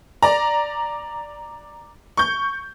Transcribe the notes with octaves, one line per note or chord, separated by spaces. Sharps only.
D5 A#5
C#6 G6